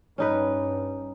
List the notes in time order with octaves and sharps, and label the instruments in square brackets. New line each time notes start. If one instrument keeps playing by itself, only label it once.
[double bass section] G2 [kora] C#4 D#4 B4